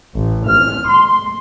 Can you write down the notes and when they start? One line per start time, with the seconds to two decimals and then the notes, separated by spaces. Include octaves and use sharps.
0.16 A1
0.49 F6
0.89 C6